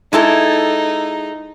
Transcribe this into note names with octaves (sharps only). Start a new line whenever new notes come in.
G#3 D#4 E4 A4